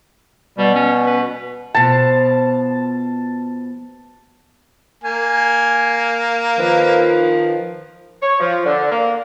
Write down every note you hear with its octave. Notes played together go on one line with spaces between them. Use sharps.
B2 G3
C#4
B4
B2 F3 A5
A#3 G#5
D#3 F3 B4
C#5
F3
D3
A#3